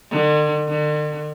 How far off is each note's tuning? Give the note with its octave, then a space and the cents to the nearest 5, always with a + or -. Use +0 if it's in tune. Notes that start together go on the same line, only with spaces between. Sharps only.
D3 +45
D3 +45